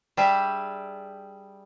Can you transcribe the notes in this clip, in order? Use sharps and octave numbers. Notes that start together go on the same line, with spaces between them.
G3 D4 G4 G#4 E5